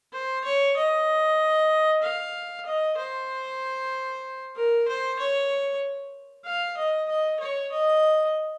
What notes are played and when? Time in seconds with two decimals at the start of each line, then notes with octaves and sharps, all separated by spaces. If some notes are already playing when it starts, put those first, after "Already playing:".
0.13 C5
0.44 C#5
0.76 D#5
2.02 F5
2.66 D#5
2.98 C5
4.56 A#4
4.88 C5
5.19 C#5
6.45 F5
6.77 D#5
7.09 D#5
7.40 C#5
7.72 D#5